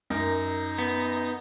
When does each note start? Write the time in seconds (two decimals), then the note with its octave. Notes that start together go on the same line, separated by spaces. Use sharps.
0.10 F#2 D#4 A#4 A#6
0.79 B3